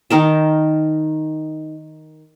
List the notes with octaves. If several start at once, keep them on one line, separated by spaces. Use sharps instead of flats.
D#3 D#4 A#4 A5